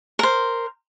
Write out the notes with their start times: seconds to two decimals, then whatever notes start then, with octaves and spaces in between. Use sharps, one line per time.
0.19 A#4 C5